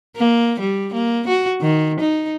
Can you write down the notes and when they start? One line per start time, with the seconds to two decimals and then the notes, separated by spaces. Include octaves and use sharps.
0.17 A#3
0.60 G3
0.93 A#3
1.28 F#4
1.61 D#3
2.00 D#4